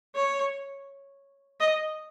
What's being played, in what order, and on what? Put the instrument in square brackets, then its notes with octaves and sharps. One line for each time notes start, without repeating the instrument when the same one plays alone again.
[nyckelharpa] C#5
D#5